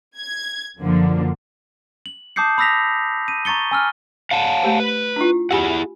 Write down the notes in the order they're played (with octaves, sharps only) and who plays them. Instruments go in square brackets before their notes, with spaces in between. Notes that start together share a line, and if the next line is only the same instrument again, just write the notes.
[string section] G#6
F#2 D3 F3 A#3
[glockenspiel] F#7
A5 D6 D#6 G6 C7 C#7
B5 D#6 E6 A#6 B6 F7
D#7
A#5 C#6 A6 C#7 G7
G#5 E6 F6
[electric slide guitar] F5 F#5 A5
[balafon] A3 G4 C5
[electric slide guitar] B4
[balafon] D4 E4 F4
[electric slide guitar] E4 G#4 F#5 [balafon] G4 G#5 B5